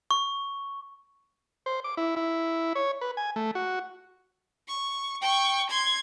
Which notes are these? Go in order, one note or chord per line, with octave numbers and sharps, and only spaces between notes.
C#6
C5
D6
E4
E4
C#5
B4
G#5
A3
F#4
C#6
G5 C#6
C6 G#6